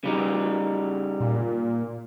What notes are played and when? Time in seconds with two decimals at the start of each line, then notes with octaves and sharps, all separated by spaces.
0.04 C#3 G3 D#4
1.20 A#2